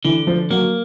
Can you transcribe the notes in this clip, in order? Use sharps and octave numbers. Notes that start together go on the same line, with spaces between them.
D3 E3
F3
F#3 A#3